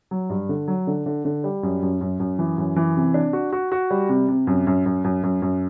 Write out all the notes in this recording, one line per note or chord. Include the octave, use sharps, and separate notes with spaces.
F#3
G2
D3
F#3
D3
D3
D3
G3
F#2
F#2
F#2
F#2
E3
F#2
E3
C3
D4
F#4
F#4
F#4
G3
C3
C3
F#2
F#2
F#2
F#2
F#2
F#2